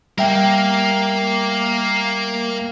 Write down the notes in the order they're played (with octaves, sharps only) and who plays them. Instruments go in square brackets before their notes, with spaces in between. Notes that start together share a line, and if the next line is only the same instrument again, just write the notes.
[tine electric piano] G3 E5 G5 [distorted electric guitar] A#3 A#4